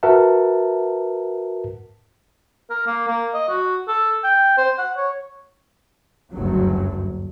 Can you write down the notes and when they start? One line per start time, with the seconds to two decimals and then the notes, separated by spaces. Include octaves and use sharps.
0.03 F#4 A#4 B4 E5 F#5 A5
2.70 A#4
2.87 A#3
3.08 A#3
3.34 D#5
3.49 F#4
3.88 A4
4.24 G5
4.58 C5
4.78 F#5
4.97 C#5
6.32 F#1 D2 G2 F#3